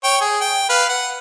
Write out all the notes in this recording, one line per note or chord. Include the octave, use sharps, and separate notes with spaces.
C#5 G5
G#4
G5
B4 F5
F#5